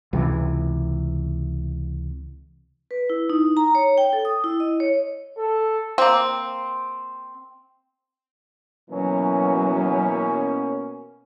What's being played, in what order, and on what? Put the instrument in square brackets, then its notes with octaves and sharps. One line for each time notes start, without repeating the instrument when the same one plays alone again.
[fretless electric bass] C#2 C3 E3
[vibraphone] B4
E4
D#4
A#5
C#5
G5
A4
D#6
E4
D#5
C#5
[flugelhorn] A4
[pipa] A#3 C4
[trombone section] B2 A#3 C#4 [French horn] E3 [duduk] F#3